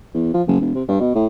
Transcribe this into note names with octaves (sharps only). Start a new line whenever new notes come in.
E2
F3
F#1
E1
C3
G2
B2
A2